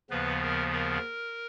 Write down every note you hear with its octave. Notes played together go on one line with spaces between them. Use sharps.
D#2 C#3 F3 B3 B4
A#4
A#4